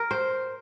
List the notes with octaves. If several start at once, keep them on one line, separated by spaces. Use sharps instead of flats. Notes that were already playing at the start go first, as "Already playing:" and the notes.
Already playing: A#4
C5